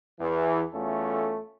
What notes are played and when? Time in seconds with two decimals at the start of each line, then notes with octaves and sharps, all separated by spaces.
0.20 E2 E3
0.74 E2 A3 C#4 F4 A4